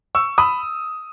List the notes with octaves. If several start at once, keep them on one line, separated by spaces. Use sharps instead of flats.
C#6 E6
B5 D#6